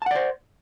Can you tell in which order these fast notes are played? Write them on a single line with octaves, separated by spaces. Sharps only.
A5 F#5 D5 C5